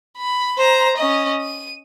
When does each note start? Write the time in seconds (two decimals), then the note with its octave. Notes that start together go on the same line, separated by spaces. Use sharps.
0.18 B5
0.58 C5 A#5
0.97 C#4 D#5
1.41 D#7